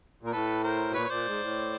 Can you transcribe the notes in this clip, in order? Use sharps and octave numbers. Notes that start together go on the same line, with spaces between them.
A#2 A#4
A2 A4 B4
A#4 C5
B2
A#2 B4 C#5
C#5
A#2 C5 D5
G#2
A2